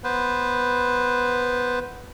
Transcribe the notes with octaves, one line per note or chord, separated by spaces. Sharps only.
B3 B4 C5